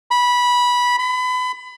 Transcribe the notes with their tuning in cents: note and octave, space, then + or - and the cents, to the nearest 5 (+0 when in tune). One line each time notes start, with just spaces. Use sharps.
B5 -15
B5 +30